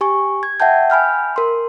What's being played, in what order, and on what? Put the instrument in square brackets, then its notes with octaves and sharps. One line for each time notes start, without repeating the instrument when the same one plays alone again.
[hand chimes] G4 G#5 C#6
G#6
E5 F#5 G5 A5 G6
G#5 B5 F6 G6
A#4 C6